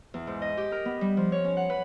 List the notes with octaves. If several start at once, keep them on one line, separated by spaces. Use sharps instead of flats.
E2
G#2
D#5
G4
A#4
B3
G3
F3
C#5
C#4
F#5
B4